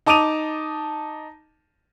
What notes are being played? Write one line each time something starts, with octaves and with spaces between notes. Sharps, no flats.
D#4 A5 D6 D#6 D#7 F7